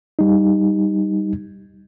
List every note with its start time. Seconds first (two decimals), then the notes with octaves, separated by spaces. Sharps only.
0.19 G3 D#4